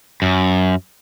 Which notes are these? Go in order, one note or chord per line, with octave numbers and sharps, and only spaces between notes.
F#2